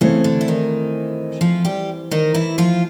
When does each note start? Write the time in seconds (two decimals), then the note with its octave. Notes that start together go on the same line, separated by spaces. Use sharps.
0.01 C#3 E3 A3 C4 C#4
0.24 D3 D4
0.41 E4
0.48 D#3 D#4
1.41 F3 F4
1.65 G3 G4
2.11 D#3 D#4
2.34 E3 E4
2.58 F3 F4